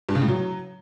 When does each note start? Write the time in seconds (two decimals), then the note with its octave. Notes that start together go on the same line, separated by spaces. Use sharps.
0.09 G2
0.15 C#3
0.22 A2
0.28 F#3